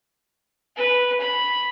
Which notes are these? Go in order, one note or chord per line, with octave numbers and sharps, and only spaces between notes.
B4
B5